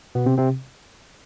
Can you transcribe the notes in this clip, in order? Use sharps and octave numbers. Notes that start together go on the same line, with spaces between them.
B2 B3
C3 C4
C3 C4